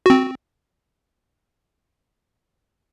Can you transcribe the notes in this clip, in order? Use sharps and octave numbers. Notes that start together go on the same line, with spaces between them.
C4 F#4